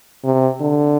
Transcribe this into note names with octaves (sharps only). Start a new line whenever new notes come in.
C3
D3